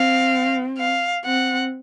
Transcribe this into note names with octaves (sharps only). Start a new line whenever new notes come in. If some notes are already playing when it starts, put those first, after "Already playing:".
Already playing: C4 F5
F5
C4 F#5